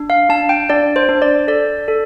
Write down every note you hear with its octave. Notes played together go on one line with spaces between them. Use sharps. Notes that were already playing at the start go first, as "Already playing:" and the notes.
Already playing: D4
F5
D4 A5
G5
D4 D5
C5
D4
D5
A4 D5
A4